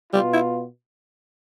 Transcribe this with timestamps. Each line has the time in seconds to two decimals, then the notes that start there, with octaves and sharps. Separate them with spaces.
0.13 B2 G3 B3 F4
0.33 E4